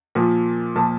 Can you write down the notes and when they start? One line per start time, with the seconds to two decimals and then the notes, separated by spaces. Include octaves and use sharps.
0.15 A#2 F3
0.76 A#2 F3 A5